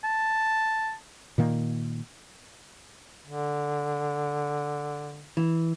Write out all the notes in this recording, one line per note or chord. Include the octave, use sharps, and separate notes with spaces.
A5
A#2 D#3 A#3
D3
E3